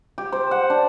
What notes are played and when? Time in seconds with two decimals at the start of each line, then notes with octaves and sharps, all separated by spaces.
0.18 G4
0.32 C5
0.51 F#5
0.70 D4